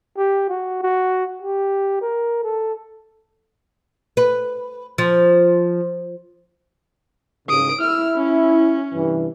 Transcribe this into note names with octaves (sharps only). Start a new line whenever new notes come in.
G4
F#4
F#4
G4
A#4
A4
B4
F3
G#2 C#3 D#6 D7
E4 E6 F6
C#4
G2 C3 E3